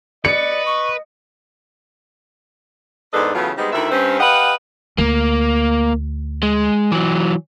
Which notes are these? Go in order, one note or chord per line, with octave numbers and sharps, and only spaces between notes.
B4 D5 D#5 C#7
C#6
E2 G#2 D4 A4 B4 D#5
A2 C#3 E3 F#3 B3 F4
G3 G#3 B3 C4 D#4 D#5
D2 D#3 E4 E5
G2 C4 C#4
G4 B4 D#5 F5 F#5
D2 A#3
G#3
E3 F#3